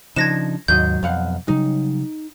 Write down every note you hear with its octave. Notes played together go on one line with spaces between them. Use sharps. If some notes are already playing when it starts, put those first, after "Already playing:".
C#3 F3 D4 D#4 G#6 A#6 E7
D#2 G#2 F#3 D#5 G6
B1 F2 F5 F#5
C#3 F#3 G3 D#4